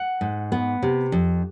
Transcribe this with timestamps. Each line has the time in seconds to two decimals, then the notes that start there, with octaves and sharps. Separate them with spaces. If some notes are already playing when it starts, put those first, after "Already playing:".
Already playing: F#5
0.21 G#2
0.52 B3
0.82 C3
1.12 F2